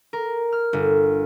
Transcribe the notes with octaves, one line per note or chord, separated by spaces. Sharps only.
A#4
F6
G1